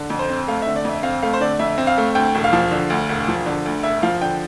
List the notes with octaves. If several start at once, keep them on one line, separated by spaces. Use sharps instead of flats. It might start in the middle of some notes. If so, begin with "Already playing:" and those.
Already playing: D3
F2
C5
C4
A3 F5
D3 E5
D5
F2 E5
C4 F5
A3 F5
C5
D3 D5
F2 E5
C4
F5
A3
D2 G5
E1
F5
F3
D3
D2
E1
F3
D3
D2
E1 E5
F3 F5
D3 G5